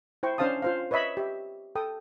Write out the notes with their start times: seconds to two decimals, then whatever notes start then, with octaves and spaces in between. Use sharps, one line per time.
0.23 E4 C5 G5 C#6
0.38 C#4 D4 C5 F5 A5 D#6
0.62 F4 C5 F5
0.91 B4 C#5 D#5 E5 B5
1.17 G4 E5
1.75 A4 G5 D#6